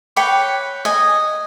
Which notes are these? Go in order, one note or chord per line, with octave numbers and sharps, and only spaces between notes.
B4 C#5 G5 D6
D#5 G#5